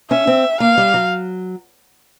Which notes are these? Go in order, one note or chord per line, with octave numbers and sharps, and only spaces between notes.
C#4 E5
C4
A#3 F5
G3
F#3